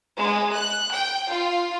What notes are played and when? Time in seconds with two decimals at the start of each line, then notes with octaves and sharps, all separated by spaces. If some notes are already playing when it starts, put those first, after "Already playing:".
0.18 G#3
0.54 F#6
0.94 G5
1.31 F4